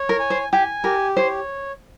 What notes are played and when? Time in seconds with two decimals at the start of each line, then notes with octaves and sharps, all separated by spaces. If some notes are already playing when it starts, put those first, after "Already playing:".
Already playing: C#5
0.09 A#4
0.20 G#5
0.30 C5
0.52 G4 G#5
0.84 G4 A#4
1.17 C5 C#5